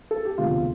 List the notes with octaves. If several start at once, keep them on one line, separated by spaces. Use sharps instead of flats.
A4
G4
E1 D2 C3 F3 A3 F4